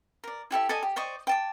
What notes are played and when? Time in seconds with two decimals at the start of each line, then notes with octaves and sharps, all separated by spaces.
0.24 A#4 D5
0.51 E4 G4 A4 E5
0.69 A4 D5 D#5 G#5
0.83 G4
0.96 C5 D5 D#5 C#6
1.27 G5 A5 D6